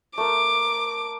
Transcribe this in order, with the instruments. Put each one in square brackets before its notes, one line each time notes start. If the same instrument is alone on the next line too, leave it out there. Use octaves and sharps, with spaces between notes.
[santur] A3 A#4 [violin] D6